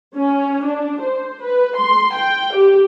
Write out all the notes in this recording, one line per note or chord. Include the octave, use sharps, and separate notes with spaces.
C#4
D4
C5
B4
C6
G5
G4